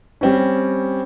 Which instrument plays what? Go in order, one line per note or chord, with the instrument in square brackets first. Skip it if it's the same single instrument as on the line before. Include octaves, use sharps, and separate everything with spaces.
[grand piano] G3 C4 C#4